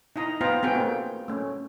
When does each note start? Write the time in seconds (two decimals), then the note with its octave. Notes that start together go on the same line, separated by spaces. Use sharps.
0.16 D#4 E4 D#5 A#5
0.41 B3 F4 C5 F5 G5 A#5
0.63 B3 C4 F4 F#4 G#4 G5
0.75 A3 A#3
1.28 A3 C#4